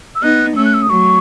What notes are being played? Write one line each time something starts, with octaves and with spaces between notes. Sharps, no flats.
E6
B3 D#4 F#6
A3 C#4 E6
F#6
E6
D#6
F#3 A3 C#6